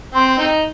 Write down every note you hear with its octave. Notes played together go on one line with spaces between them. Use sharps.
C4 C6
C4 D#4